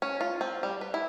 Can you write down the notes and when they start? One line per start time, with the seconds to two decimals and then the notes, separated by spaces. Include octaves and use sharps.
0.02 C#4
0.21 F4
0.41 C4
0.63 G3
0.81 B4
0.94 E4